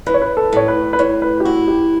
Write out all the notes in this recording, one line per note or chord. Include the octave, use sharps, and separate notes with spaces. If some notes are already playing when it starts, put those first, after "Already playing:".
E3 B4
C#5
B4
A4
A2 C#5
B4
B4
A2 C#5
B4
G4
E4 F#4
G4